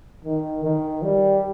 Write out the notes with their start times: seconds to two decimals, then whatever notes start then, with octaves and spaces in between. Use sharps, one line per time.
0.25 D#3
0.63 D#3
1.03 G3